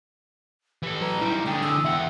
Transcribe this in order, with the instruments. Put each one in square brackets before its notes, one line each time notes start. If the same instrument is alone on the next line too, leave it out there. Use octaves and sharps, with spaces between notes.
[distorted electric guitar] E3 A4 [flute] G4
[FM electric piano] F#3 B4 C#7 [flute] A#5
[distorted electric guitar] G3 D#4 [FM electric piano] E4
[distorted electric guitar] D3 G#4 [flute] G5
[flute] E6
[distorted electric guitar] E2 F#5 [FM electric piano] E5 G5